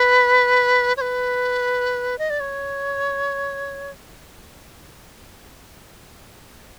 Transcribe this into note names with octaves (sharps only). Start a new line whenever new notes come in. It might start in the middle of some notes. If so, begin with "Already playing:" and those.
Already playing: B4
C#5
B4
D#5
D5
C#5